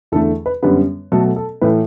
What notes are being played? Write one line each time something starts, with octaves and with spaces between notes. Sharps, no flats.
E2 D3 A3 A4
B4
F#2 D3 G3 B3 B4
B2 F#3 A3 A4
A4
A2 E3 A3 B4